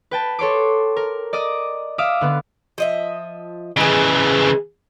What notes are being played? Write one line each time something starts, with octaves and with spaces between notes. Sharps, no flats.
B4 G5 A5
A4 C#5 C6 D6
A#4
D5 D#5 D6 D#6
E5 F5 D6 D#6
D3 B3
F3 D#5 E5
C#3 E3 G#3 G#4